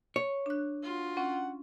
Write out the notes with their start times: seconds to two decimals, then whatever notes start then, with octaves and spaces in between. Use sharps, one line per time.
0.16 C#5
0.46 D4 F#6
0.82 F4 F#4
1.17 C#4 F#5